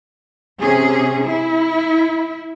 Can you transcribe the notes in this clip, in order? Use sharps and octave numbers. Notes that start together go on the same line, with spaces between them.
C3 C#4 G#4
E4